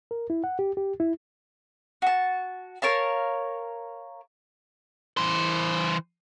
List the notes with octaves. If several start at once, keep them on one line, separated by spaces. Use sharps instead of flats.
A#4
E4
F#5
G4
G4
E4
F#4 A5
A#4 C#5 F5 A5
E3 C5